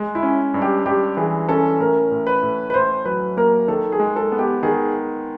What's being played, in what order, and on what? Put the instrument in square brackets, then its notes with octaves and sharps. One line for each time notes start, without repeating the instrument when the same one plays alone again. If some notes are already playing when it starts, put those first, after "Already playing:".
Already playing: [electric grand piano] G#3
[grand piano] E4
[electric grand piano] C#4
G2
[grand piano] G4
[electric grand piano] G2 [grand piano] G4
[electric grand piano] E3 [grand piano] G#4
[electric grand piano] C#4 [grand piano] A4
[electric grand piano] A2 [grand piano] A#4
[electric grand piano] A2
[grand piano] B4
[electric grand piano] A2
[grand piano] B4
[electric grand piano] A2 [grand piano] C5
[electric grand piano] F#3 [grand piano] B4
[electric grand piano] A#3 [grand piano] A#4
[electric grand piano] D#3 [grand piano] A4
[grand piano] G#4
[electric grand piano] G#3
[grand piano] A4
[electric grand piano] B3
[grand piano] G4
[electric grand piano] D#3 [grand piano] G#4